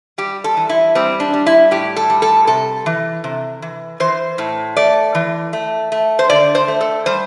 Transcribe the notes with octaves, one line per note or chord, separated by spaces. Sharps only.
G3 G4
A4
E3
E4
G3 C4
D4
G3
E4
A2 G4
A4
G3
A4
C3 A4
E3
C3
E3
E3 C5
A2
A3 D5
E3
A3
A3
C5
D3 D5
C5
A3
A4
G3 C5